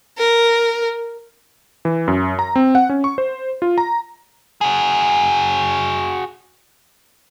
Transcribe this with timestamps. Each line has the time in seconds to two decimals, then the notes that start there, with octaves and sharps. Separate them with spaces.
0.18 A#4
1.85 E3
2.08 F#2
2.39 A#5
2.56 C4
2.75 F#5
2.89 C#4
3.04 C#6
3.18 C5
3.62 F4
3.78 A#5
4.61 F#4 G#4